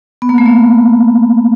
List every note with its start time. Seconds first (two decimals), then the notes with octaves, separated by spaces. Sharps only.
0.22 B3
0.29 A#3
0.38 A3
0.46 A#3